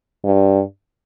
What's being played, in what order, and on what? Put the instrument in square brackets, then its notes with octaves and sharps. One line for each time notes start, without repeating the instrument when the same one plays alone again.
[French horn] G2